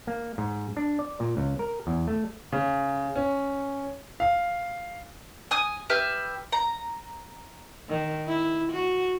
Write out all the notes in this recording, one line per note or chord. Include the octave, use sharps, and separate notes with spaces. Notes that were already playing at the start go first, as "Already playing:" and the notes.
A#3
G#2
D4
D5
A#2
C#2
A#4
E2
A3
C#3
C#4
F5
G#5 D#6
G4 B4 E5 F6
A#5
D#3
E4
F#4